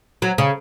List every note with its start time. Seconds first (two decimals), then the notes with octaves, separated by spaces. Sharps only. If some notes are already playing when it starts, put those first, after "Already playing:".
0.22 F#3
0.38 C#3